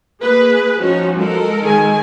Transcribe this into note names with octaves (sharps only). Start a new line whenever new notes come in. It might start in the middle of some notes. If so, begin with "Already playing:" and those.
A#3 G#4 B4
F3 C#4 D#4 F#4
G#3 A4 A#4
D#3 G#4 G#5